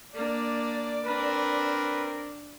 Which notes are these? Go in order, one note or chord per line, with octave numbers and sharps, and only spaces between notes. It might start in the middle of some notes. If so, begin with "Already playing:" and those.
A#3 D4 D5
C4 D4 A#4 B4